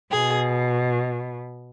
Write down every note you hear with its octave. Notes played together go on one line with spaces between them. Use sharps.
B2 G#4